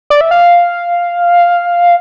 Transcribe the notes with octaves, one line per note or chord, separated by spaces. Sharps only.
D5
E5
F5